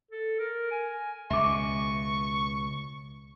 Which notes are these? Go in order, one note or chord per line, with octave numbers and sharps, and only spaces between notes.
A4
A#4
G#5
C#2 B2 E5 C#6 D6